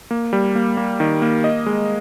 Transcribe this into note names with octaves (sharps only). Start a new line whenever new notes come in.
A#3
G3
A#3
A#3
D#3
A#3
D#5
G#3